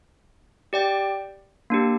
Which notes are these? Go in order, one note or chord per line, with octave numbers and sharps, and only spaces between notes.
G4 D5 G5
A#3 D4 G4